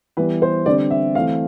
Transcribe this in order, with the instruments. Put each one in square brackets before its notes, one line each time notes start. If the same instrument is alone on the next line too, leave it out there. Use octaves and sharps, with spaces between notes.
[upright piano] E3 G3 B3 B4
C5
D3 G3 C4 D5
E5
E3 A3 C4 F5